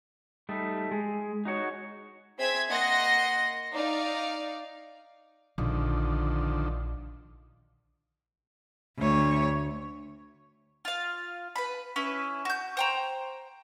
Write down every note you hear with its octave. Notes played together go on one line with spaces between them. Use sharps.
G3 A3 D#4
G#3
D#4 F#4 C#5
C4 G#4 E5 G#6 B6
A#3 D#5 F#5 C6 A#6
D#4 D5 F5
A#1 D3 D#3 F3
D2 C#5
F4 F5
B4 B5
C#4 E4 B4
F#4 G6
C5 G5 A#5